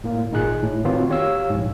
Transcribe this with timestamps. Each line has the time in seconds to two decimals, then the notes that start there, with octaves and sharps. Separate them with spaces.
0.04 A2 A#3
0.31 G#1 A#2 D#4 G#4 F#6
0.63 A2
0.85 D#3 B3 C4 F4 F#4 C#5
1.10 G4 C#5 F5 E6
1.50 A#1 G#2